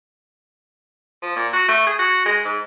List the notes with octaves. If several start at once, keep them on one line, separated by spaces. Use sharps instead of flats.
F3
A#2
F#4
A3
G#4
F#4
G#3
G#2